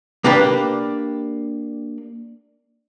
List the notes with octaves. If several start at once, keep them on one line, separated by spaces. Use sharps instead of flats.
A#3 D4 G4 B4